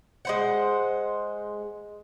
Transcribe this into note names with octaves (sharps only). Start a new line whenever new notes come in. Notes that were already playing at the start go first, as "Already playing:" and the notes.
G#3 C5 F#5